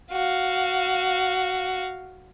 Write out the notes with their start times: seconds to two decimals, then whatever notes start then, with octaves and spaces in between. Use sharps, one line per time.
0.12 F#4 F5